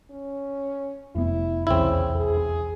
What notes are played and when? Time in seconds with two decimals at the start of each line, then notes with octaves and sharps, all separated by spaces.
0.11 C#4
1.15 F1 B3 E4
1.67 F1 B1 E2 C#3 C4 E4
2.16 G#4